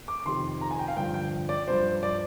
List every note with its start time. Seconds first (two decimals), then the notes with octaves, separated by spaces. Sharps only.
0.08 D6
0.26 F2 C3 D#3 C6
0.61 A#5
0.71 G#5
0.79 G5
0.88 F5
0.97 G2 D3 F3 G5
1.14 G5
1.49 D5
1.67 G2 F3 C5
2.03 D5